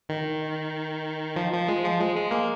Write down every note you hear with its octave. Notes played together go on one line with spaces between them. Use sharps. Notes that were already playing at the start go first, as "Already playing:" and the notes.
D#3
F3
F3
G#3
F3
G#3
G#3
A#3